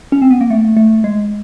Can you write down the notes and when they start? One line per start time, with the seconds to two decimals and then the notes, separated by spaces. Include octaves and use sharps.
0.12 C#4
0.22 C4
0.31 B3
0.41 A#3
0.50 A3
0.77 A3
1.04 G#3